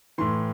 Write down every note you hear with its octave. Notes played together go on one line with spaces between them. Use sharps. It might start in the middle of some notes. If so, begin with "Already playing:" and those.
A2 E3 C6